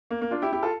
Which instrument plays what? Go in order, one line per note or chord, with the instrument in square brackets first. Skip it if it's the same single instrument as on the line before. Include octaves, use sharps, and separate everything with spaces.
[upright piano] A#3
A#3
D4 F4
E4 G4
E4 G4
F4 A4